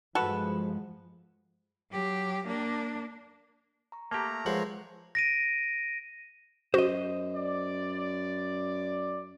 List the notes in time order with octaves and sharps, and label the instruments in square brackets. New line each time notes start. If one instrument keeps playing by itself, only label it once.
[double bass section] G2 F3 G#3 [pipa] F#4 A4 B4
[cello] F#3 G4
A#3 D4
[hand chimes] A#5 C#6
[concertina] A3 A#5 [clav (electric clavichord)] A#3 G4 [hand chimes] A5 D6
[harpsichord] F3 G#3 [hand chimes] A#4 B4 C#5 [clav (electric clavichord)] F#5
[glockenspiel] A#6 D7 D#7
[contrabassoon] F#2 [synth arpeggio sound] F#4 [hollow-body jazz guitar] C5 D#5
[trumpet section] D5